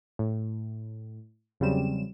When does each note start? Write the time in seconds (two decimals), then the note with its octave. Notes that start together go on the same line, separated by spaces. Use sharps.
0.19 A2
1.60 E2 C#3 F#3 G3 C4 E7